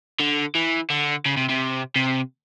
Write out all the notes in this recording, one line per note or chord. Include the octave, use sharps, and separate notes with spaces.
D3
E3
D3
C#3
C3
C3
C3